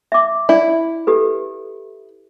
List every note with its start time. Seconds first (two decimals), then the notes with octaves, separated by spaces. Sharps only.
0.12 E5 D6
0.49 E4 D5
1.07 G4 A4 B4